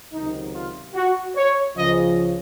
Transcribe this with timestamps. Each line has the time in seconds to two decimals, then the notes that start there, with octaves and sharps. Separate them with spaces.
0.13 C#2 C3 D#3 F#3 D#4
0.54 F4
0.94 F#4
1.36 C#5
1.76 C#2 C#3 F3 D#5